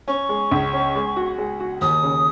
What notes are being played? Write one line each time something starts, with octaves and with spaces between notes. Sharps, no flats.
C#4 C#6
G#3
C#2
C#4
G#3
F#4
G#3
F#4
D#2 D#6
C#3